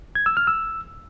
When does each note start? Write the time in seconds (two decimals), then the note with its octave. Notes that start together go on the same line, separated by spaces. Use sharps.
0.15 G#6
0.26 E6
0.37 F6
0.47 E6